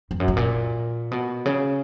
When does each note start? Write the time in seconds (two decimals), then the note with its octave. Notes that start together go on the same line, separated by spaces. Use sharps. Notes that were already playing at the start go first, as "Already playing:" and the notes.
0.11 F2
0.20 F#2
0.28 G#2
0.37 A#2
1.11 B2
1.45 C#3